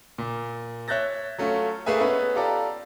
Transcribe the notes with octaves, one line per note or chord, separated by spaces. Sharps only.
A#2
C#5 E5 F#6 G6 A6 A#6
F#3 A3 C#4 F4
A3 A#3 G#4 B4 E5 G#5
B3 C#4 D#4 B4 E5
F4 G4 A4 D5 A#5